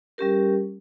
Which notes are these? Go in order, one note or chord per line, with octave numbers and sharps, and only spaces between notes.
G3 C#4 G4 A#4